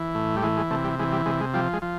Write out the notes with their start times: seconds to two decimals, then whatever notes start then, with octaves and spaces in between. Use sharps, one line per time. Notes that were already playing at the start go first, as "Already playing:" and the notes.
Already playing: E3
0.15 A2
0.36 G3
0.43 E3 G#3
0.57 G#3
0.70 C3 A3
0.84 G3
0.99 E3 G#3
1.12 G3
1.26 C3 G#3
1.40 G#3
1.54 F3 G3
1.73 G#3
1.82 F3